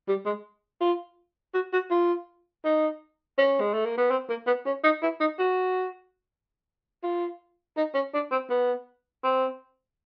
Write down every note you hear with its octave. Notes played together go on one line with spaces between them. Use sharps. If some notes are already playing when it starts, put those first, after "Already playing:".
G3
G#3
F4
F#4
F#4
F4
D#4
C#4
G#3
A3
A#3
B3
C4
A#3
B3
C#4
D#4
E4
D#4
F#4
F4
D#4
C#4
D4
C4
B3
C4